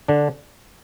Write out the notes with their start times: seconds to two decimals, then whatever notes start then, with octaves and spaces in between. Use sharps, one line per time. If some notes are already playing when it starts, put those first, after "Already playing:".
0.08 D3 D4